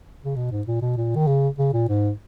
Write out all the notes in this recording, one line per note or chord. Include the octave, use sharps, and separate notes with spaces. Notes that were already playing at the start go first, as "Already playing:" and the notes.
C#3
B2
G#2
A#2
B2
A#2
D#3
C#3
C#3
A#2
G#2